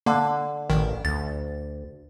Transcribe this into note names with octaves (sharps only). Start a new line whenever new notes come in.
D3 A#3
A1 D#3
D2 A6